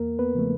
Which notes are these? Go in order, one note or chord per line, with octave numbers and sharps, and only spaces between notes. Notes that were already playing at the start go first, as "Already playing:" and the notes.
Already playing: E2 A#3 A#4
B3 B4
C#3 F3 A3